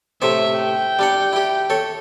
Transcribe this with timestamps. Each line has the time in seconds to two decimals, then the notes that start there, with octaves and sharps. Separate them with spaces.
0.22 A2 C3 C5 E5
0.57 G5
0.99 G3 D4 F#5
1.33 E4 G4
1.70 A4 C#5